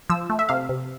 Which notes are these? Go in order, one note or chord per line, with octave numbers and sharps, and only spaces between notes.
F3 E6
A3
E5
C3 F5
C3